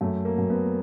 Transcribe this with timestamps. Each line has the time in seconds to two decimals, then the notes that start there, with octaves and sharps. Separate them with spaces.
0.01 F#2 A3
0.25 A#3
0.38 F#2
0.50 B3